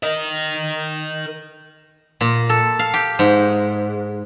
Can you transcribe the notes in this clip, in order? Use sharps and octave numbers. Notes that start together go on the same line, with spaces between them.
A#4 D#5
A#2
A4
F5
G4
G#2